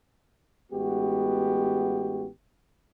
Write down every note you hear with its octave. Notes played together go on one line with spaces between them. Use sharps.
A1 G#3 B3 F#4 G4